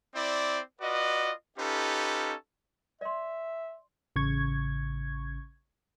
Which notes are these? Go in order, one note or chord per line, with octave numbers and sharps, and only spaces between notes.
C4 E4 C5 D5
F4 F#4 B4 D5 D#5
C#4 D#4 F4 G4 A4 B4
D5 E5 C6
A1 C#3 C#6 G#6